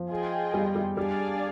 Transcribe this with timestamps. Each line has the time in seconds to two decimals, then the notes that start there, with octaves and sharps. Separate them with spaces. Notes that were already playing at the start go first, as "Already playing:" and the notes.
Already playing: F3
0.10 F4 G#4 D#5 G5
0.54 G3
0.76 G3
0.97 G3 D4 G#4 D5 F5 G#5